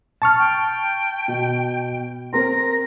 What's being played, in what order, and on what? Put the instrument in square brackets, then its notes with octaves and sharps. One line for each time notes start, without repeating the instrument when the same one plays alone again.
[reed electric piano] A5 C#6 F6
[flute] G5
[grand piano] B2
[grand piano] C4 A#4 C6 [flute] A#6